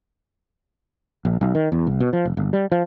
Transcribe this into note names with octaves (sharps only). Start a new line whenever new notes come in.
A#1
B1
D#3
E2
C2
B2
F3
F1
G1
G3
F3